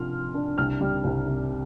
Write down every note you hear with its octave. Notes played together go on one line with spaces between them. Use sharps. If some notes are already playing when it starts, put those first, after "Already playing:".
Already playing: C3 F3 D4 F4 C6 F6
F4
D4
C2 F6
G3
C2
C3